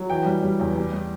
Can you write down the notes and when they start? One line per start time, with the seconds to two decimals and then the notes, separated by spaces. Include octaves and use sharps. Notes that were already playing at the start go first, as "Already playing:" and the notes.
Already playing: F#3
0.10 E3 G5
0.26 G3
0.43 G3
0.60 E2
0.76 G3
0.92 G3